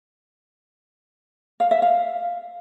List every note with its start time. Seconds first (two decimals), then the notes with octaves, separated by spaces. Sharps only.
1.60 F5
1.71 E5
1.82 F5